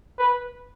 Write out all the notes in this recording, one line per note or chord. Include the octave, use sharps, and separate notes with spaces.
B4